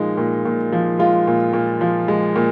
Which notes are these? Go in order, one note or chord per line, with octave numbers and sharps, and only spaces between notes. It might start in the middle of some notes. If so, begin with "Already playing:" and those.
Already playing: A#2 F3 G#3 D#4
A#2
A#2
F3
G#3 F4
A#2
A#2
F3
G#3
A#2